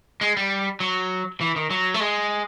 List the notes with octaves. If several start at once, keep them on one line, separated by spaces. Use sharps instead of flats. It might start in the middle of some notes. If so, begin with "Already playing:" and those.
G#3
G3
F#3
E3
D#3
F#3
A3
G#3